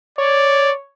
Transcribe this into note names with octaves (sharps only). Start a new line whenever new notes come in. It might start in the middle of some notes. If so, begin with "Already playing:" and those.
C#5 D5